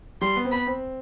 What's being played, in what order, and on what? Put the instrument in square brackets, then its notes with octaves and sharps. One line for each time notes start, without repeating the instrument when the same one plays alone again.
[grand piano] G3 [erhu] C6
[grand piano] B3
C4
[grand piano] B3 [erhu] B5
[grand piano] C4